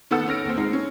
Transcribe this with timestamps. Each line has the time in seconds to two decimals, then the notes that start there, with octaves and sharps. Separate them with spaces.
0.11 D#3 B3 A4 F#5 E6 C#7
0.26 B3 C#4 F6 A#6 D7
0.45 D#2 C4
0.57 G#3 D#4
0.73 C#4